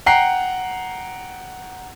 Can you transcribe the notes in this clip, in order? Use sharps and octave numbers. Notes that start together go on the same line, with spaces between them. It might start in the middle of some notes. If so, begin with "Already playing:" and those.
F#5 G5 A#5 C7